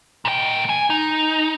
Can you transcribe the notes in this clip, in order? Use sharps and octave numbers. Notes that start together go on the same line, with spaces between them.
A#2 G5
G#5
D#4